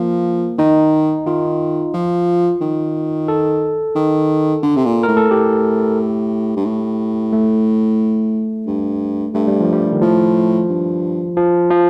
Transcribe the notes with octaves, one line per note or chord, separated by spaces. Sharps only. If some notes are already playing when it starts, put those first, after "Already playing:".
Already playing: F3 A#3
D#3 D#4
D#3 F4
F3
D#3
A4
D#3
D3
C3
A#2
A2 A#4
A4
A2 G4
G2
A2
A3
G2
G2 A3
G3
F3
G3
D#3
A2 F3
G2
F3
F3